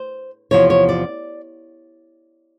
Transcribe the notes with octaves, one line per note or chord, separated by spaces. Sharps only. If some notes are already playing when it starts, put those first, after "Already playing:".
Already playing: C5
E2 C3 F3 C#5
C#5
D5